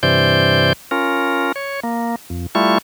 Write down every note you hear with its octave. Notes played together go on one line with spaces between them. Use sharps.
G2 C3 E3 C5 D5 G6
C#4 F4 A#4
C#5
A#3
F2
G3 A3 E4 F4 C#6